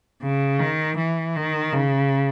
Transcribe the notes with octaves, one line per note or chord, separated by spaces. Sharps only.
C#3
D#3
E3
D#3
C#3